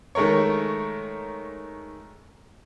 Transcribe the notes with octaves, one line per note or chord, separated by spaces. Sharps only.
D#3 G#3 A3 A#4 C#5